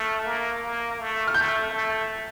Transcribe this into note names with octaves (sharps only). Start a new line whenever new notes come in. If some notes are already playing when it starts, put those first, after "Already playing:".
Already playing: A3 F6
A#3
A#3
A3
F6
A3 G6
A3